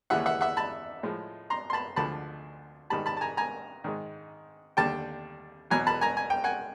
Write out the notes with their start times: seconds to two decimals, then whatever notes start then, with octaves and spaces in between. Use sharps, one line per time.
0.10 D#2 C#3 E3 G3 E5 F#5
0.26 E5 F#5
0.41 E5 F#5
0.57 A5 B5
1.03 A2 F3 G#3
1.50 A#5 C6
1.70 C6
1.73 A5 B5
1.96 D2 D3 F3 G#3 A5 B5
2.90 G#2 D#3 G3 A5 B5
3.06 A5 B5
3.17 A5
3.21 G#5 A#5
3.37 G#5 A#5
3.84 G#2 D#3 G#3
4.77 D#2 D3 G3 G5 A5
5.71 E2 B2 F#3 G#5 A#5
5.87 A5 B5
6.01 G#5 A#5
6.17 G#5
6.30 G5
6.44 F#5 G#5